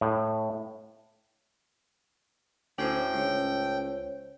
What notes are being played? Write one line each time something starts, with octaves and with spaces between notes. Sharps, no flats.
A2
D2 A2 C#4 D4 C5 C#5 G5
C#2 C5 C#5